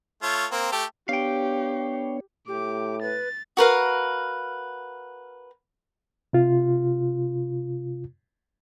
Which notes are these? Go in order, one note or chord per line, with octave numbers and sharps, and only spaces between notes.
A3 F4 C#5
A#3 C4
A3 G4 A4
B3 D4 G4 C#5 F5 G5
A2 G4 D6
B4 A6
F#4 A#4 B4 F5
C3 F4